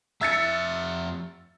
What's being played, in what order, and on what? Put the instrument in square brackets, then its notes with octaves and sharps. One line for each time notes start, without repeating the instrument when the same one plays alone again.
[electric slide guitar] F2 E5 [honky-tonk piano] E6 A6 C#7